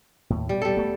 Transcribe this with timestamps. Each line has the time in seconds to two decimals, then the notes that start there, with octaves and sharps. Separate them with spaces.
0.30 D#2 A2
0.49 B2 G3
0.62 G3 A4
0.77 A3 B3